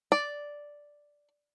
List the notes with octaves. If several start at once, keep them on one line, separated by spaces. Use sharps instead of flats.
D5